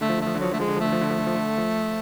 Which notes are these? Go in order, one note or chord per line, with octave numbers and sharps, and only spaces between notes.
D3 A3
F3
D3
A3
F3
D3
F3 F#3
D3 A3
F3 G#3
D3
F3
D3 A3
F3
D3
F3
D3
F3
D3
F3